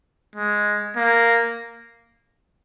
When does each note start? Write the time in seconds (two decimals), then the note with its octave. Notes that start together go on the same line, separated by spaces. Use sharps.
0.36 G#3
0.96 A#3